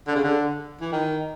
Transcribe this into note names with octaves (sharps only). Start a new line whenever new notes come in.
D3
C#3
D3
E3
D#3